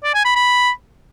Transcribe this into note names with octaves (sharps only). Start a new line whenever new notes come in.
D5
G#5
B5
B5